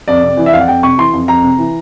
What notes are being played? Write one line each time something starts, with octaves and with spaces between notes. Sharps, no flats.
F2 D5
C3
E3
E5
F2 F5
F#5
F2 G5
C3 C#6
E3 C6
F2
F2 A#5
C3
E3